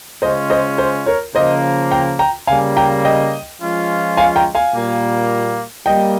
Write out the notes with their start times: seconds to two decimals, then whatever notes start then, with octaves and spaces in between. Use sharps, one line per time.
0.22 C#3 G#3 C#4 F4 C5 D#5
0.50 C5 D#5
0.78 C5
1.06 A#4 C#5
1.35 C#3 F3 A#3 C5 D#5
1.91 G5 A#5
2.19 G5 A#5
2.47 C#3 G3 A#3 F5 G#5
2.76 G5 A#5
3.05 D#5 G5
3.61 F3 G#3 C#4 F4
4.17 F5 G#5
4.36 G5 A#5
4.55 F5 G#5
4.74 A#2 G3 A#3
5.86 G3 A#3 D#5 G5